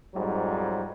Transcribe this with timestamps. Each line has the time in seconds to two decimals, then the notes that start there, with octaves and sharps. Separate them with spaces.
0.15 F2 G#2 F#3 G3